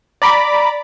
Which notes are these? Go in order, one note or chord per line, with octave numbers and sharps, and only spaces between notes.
D5 A#5 B5 D6